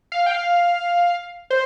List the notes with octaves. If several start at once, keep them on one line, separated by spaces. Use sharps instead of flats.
F5
G5
F5
C5